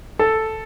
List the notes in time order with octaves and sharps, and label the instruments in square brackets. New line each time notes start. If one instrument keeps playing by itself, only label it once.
[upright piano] A4